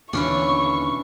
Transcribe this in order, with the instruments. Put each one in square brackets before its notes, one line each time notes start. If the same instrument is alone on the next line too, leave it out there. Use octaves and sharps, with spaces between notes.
[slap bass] D#2 B2 D3 [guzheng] E3 C#4 D4 [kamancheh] C#6